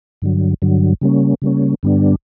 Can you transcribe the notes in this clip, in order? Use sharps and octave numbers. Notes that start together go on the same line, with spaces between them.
G2 D3 F#3
G2 D3 F#3
C#3 G3 A#3 C#4
C#3 G3 A#3 C#4
G2 D3 G3 B3 D4